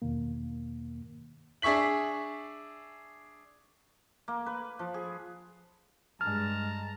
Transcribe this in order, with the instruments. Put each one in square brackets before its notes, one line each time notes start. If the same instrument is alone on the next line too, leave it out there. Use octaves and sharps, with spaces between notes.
[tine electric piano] E2 B2 D#3 A#3
[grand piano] D4 G#4 E5 C#6 B6 F#7
[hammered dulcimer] A#3
B4
F3
G#4
[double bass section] G2 G#3 [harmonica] A5 A#5 [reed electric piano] F6